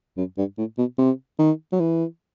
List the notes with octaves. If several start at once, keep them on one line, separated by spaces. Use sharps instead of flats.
F#2
G2
A2
B2
C3
D#3
F#3
E3